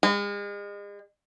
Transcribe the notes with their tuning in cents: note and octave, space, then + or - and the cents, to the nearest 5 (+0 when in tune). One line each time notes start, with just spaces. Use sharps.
G#3 -40